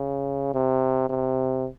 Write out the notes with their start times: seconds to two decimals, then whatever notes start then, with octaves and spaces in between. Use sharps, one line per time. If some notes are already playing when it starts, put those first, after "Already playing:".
Already playing: C#3
0.54 C3
1.10 C3